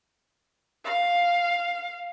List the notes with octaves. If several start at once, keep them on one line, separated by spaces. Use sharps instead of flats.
F5